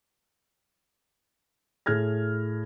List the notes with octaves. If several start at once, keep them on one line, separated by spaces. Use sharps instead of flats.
A2 G#4 F6 G#6 A#6